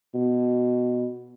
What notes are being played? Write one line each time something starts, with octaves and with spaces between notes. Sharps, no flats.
B2